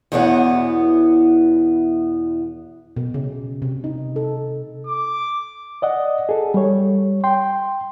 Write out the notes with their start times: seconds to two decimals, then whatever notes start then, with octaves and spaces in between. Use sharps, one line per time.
0.12 E2 B2 E3 B3 C#5 F#5
2.96 B2
3.14 C#3
3.62 C3
3.84 D#4
4.16 A4
4.87 D6
5.82 D5 D#5 F#5
6.29 G#4 A4
6.54 G3 C#5
7.24 G5 C6